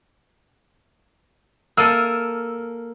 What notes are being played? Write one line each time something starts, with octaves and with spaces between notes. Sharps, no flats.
A#3 A4 E6 F6 D#7